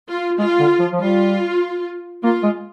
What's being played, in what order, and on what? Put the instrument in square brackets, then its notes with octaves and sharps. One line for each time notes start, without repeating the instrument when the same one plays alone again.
[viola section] F4
[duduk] G#3 [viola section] F4
[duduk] D3
F3
F3
[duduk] G3 [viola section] F4
[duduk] A#3 [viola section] F4
[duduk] G#3